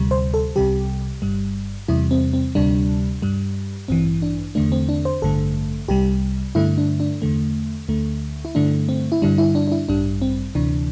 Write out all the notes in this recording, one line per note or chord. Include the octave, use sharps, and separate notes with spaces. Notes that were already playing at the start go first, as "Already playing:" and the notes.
Already playing: D2 C3 G3
C5
A4
C2 C3 G3 G4
G1 G2 G3
E2 C3 G3 E4
C4
C4
D2 C3 G3 D4
G2 G3
A1 G2 E3 C4
D4
E2 D3 A3 D4
C4
D4
C5
A1 G2 D3 A3 A4
C2 C3 G3 G4
G2 D3 A3 E4
D4
D4
E2 D3 A3
D2 D3 A3
E4
G2 D3 A3 D4
C4
E4
G2 D3 G3 D4
E4
D4
D4
E4
A1 G2 G3 D4
C4
D2 C3 E3 D4